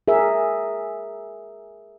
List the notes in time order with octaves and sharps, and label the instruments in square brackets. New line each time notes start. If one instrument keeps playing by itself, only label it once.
[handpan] G#4 A#4 E5